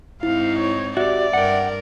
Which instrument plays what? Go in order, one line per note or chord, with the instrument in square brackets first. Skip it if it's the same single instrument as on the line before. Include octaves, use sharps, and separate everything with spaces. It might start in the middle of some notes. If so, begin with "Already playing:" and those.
[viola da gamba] G#2 C4 D#4 [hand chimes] E4 [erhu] F5
[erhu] C#5
[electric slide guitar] F#4 G4 [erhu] D5 [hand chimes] E5
[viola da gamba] G2 A#4 [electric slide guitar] F#5 G5